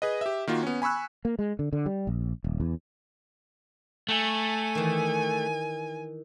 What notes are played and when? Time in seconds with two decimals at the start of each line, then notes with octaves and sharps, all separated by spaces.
0.02 G#4 B4 D#5
0.21 G4 E5
0.47 D#3 A#3 F4 F#4
0.63 B3 C#4
0.82 G#5 B5 C#6 E6 F#6
1.25 A#3
1.39 G#3
1.59 D3
1.73 D3
1.86 G3
2.07 A#1
2.44 D#1
2.60 E2
4.08 A3 G#5
4.75 D#3 E3